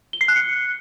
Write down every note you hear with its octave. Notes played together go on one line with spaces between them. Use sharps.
G7
C7
F#6
C#7